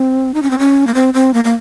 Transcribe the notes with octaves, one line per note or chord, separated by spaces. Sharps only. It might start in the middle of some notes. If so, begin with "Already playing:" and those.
Already playing: C4
D#4
C#4
C4
C#4
A#3
C4
C4
A#3
A#3